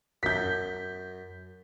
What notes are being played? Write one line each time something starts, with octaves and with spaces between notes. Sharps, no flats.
F#2 G6 B6